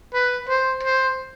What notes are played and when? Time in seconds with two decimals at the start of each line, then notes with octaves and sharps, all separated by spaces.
0.14 B4
0.49 C5
0.83 C5